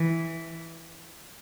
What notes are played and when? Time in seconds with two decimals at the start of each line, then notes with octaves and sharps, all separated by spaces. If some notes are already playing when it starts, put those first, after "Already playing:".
Already playing: E3